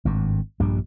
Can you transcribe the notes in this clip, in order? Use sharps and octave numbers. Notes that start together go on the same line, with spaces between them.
G#1 G2
A#1 G2 G3